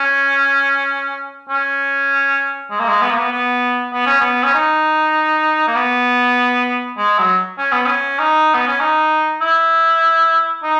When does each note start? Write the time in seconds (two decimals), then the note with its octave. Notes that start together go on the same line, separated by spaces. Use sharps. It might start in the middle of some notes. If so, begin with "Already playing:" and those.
Already playing: C#4
1.49 C#4
2.71 G#3
2.79 A#3
2.88 G#3
3.02 B3
3.10 A#3
3.19 B3
3.32 B3
3.93 B3
4.06 C#4
4.20 B3
4.43 C#4
4.54 D#4
5.68 A#3
5.76 B3
6.98 G#3
7.18 F#3
7.59 C#4
7.73 B3
7.86 C#4
8.19 D#4
8.54 B3
8.68 C#4
8.80 D#4
9.41 E4
10.63 D#4